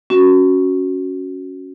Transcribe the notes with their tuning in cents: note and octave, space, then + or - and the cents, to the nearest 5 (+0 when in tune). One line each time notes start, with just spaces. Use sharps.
C#4 +0 F#4 +0